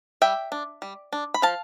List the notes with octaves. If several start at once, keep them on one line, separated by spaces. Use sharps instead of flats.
G3 E5 G5
D4
G3
D4
B5
F3 F5 A5